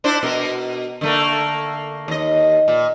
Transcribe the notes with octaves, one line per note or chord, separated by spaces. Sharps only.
D4 E4 C5
B2 A#4
D3 A3 A#3
D#2 D#5
A#2